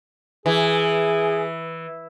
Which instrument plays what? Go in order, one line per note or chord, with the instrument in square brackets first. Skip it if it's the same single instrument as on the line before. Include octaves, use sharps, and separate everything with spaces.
[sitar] E3 [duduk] G#4